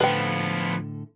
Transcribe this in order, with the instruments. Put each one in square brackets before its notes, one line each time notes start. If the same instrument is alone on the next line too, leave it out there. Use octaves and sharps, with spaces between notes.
[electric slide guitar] A2 D3 A4 [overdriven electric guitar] F3 B3 [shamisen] B4 G5